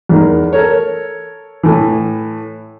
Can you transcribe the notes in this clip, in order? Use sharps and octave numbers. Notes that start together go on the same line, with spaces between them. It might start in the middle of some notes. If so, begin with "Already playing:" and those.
E2 D#4 A#4
A4 A#4 C#5
A2 E3